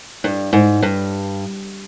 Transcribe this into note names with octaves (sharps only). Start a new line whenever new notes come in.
G2
G#2
G2